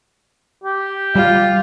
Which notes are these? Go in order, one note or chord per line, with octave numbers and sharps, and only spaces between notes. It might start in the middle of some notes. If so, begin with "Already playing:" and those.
G4
G3 F4